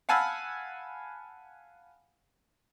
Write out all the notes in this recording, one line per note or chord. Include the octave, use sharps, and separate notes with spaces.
F5 F#5 G#5 A5 B5 E6